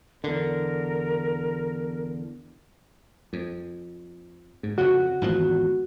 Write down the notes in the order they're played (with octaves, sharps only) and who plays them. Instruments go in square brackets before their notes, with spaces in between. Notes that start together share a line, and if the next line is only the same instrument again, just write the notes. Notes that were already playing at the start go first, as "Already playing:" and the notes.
[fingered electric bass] E2 D3 [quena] A#4
[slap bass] F2
G#2
[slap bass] F2 C#3 [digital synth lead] F#4
[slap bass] G#1 E2 F3